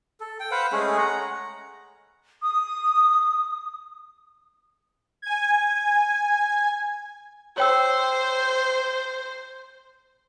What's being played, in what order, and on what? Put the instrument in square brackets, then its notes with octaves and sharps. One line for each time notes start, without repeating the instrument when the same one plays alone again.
[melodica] A4
G5
B4 C5 F5 F#5
G#3 A3 C#4 G#4
F#5 A#5
[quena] D#6
[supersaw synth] G#5 G#6
[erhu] C5 [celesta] C#5 G5 E6